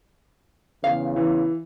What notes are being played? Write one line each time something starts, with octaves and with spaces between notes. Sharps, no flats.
E2 C#3 F5
E3